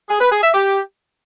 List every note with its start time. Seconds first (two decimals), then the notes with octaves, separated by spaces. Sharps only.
0.09 G#4
0.20 B4
0.31 G#4
0.43 E5
0.54 G4